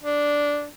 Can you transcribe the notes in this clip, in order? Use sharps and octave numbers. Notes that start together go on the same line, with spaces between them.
D4